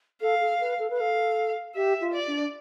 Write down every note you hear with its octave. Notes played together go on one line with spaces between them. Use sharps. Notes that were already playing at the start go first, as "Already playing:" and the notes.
A4 F5
A4
B4
A4
B4
A4 F5
G4 E5
F4
D5
D4